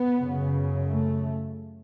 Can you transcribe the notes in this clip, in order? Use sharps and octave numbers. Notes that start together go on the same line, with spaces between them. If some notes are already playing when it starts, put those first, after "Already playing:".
Already playing: B3
F#2 C#3
A3